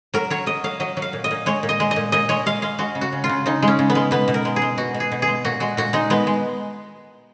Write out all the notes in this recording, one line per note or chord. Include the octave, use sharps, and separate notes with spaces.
F#3 A#4
F#3 C#5
F#3 D#5
F#3 F5
F#3 D#5
F#3
F5
A#2
D#5
A#2
G#3 C#5
A#2
D#5
G#3
D#5
A#2
A#2 D#5
G#3 C#5
G#3 F5
G#3 F5
G#3 F#4
C#3
F#4
C#3
F4
C#3
C#3 D#4
G#3
C#4
C#3
B3
G#3
B2 B3
B2
A#4
G#3
G#4
G#3
B2 F#4
B2
G#4
B2
G#4
G#3
A#2 F#4
G#3 F#4
A#2 F#4
G#3 D#4
G#3 B3
G#3